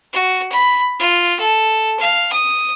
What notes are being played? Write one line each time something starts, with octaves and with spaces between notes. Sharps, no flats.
F#4
B5
F4
A4
F5
D#6